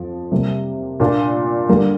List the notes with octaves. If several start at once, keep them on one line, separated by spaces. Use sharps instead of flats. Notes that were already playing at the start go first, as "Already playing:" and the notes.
Already playing: F2 F3
C3 G3 A#3
A#2 A#3 D4 F4
D3 G3 A#3